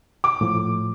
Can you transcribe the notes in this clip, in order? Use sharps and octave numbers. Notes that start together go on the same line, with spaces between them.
D6
A2 F3